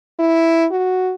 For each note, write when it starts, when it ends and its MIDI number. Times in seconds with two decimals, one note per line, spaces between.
0.19 0.66 64
0.71 1.13 66